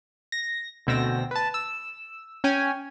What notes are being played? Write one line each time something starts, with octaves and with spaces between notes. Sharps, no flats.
A#6
D2 B2 C4 E6 A#6
B4 A5
E6
C#4 G5 G#5